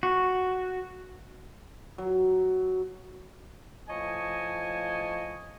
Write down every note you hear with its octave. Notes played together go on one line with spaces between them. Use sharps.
F#4
F#3
A2 F3 C#5 D#5 G#5 A5